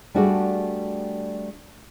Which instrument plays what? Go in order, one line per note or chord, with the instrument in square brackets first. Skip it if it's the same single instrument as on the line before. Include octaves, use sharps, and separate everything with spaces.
[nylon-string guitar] G3 A3 D4 F#4 G#4 D5